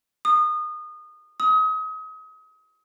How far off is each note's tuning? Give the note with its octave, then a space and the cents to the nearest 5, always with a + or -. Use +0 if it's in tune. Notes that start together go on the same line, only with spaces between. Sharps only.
D#6 -25
D#6 +35